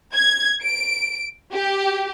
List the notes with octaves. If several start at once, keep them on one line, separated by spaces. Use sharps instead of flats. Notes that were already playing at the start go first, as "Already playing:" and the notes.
G#6
D7
G4